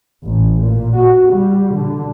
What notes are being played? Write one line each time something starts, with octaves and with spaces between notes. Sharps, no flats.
A1
A#2
F#4
G3
D3